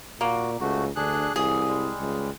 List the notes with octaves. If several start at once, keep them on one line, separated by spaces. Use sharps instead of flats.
A#2 A#3 F#4
C#2 A3 F#4
D2 D4 G#4 F#6
C2 E3 G#4
G3 G#3
C#2